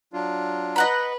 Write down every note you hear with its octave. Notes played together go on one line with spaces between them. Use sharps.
F#3 D4 F4
B4 D#5 F#5 A#5 B5